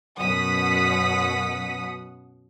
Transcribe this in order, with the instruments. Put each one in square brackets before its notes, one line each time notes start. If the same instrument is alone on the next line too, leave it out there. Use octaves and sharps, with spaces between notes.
[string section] F#2 B2 F#5 D#6 B6